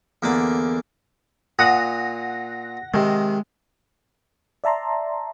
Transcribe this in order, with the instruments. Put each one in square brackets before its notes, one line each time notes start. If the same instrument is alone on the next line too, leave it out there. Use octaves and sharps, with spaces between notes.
[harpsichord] E2 D3 A#3 D5 D6
[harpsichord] A#2 A#5 D#6 [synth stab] F#5 A#6
[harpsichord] C3 D#3 [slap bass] G#3
[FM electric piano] D5 E5 A5 A#5 C6